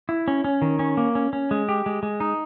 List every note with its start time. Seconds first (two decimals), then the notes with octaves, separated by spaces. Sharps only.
0.09 E4
0.28 C#4
0.44 C#4
0.62 D#3
0.79 C#4
0.97 A#3
1.15 C#4
1.33 C#4
1.51 G#3
1.69 G4
1.86 G#3
2.03 G#3
2.20 D#4